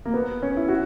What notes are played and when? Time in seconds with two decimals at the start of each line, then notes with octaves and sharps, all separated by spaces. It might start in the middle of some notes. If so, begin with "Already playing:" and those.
0.06 A#3
0.14 B3
0.42 C#4
0.57 E4
0.68 F#4